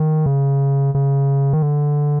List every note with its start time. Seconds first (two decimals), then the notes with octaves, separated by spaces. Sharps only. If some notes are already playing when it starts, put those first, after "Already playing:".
Already playing: D#3
0.26 C#3
0.95 C#3
1.53 D#3
1.62 D3